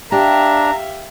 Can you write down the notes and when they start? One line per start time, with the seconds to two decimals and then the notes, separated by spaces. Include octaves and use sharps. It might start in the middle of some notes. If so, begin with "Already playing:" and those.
0.12 D4 G4 E5 F5 A#5